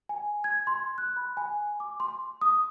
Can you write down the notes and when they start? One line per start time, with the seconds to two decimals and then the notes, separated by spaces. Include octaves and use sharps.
0.09 G#5
0.44 G#6
0.67 C6
0.98 F#6
1.17 B5
1.37 G#5
1.80 D6
2.00 C6
2.42 D#6